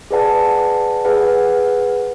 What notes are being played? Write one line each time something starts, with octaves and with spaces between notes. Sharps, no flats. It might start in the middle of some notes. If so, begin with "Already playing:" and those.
G#4 B4 D5 F#5 A5
G#4 B4 F#5